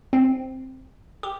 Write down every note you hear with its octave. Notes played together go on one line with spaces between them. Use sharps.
C4
G4